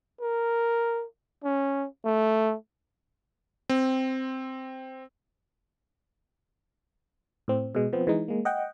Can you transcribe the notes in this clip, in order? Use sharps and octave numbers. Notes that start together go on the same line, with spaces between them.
A#4
C#4
A3
C4
A2 C4
B2 G#3
F3 B3 C4
E3 G#3 D#4
G#3 A#3
D#5 F#5 G5